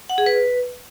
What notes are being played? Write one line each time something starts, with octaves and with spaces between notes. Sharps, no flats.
F#5
G#4
B4